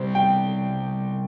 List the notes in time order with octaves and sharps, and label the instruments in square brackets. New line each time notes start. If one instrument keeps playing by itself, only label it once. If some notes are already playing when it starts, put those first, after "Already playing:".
Already playing: [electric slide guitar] C3 G3 C4 [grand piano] C5
[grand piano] G5